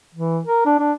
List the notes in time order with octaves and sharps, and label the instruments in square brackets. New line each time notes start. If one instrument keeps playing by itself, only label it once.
[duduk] E3
A#4
D4
D4